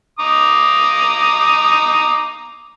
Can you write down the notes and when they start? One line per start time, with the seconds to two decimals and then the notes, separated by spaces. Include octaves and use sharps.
0.20 A#5 D6 D#6